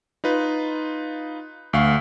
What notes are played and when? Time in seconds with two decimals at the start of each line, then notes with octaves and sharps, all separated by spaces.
0.24 D#4 F4 B4
1.73 D2 F5 C#6